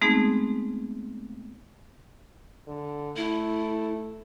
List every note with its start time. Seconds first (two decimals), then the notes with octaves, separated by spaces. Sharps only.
0.01 G#3 A3 B3 C4 D#4 G#4
2.67 D3
3.16 A3 E4